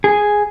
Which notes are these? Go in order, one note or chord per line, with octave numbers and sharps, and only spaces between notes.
G#4